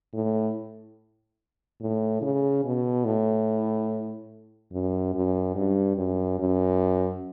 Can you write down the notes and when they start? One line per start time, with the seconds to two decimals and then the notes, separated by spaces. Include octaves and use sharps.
0.13 A2
1.80 A2
2.22 C#3
2.64 B2
3.05 A2
4.72 F#2
5.14 F#2
5.55 G2
5.97 F#2
6.39 F#2